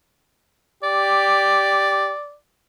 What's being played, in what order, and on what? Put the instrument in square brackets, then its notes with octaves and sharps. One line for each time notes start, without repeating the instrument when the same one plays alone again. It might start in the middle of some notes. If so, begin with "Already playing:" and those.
[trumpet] G4 [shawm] D5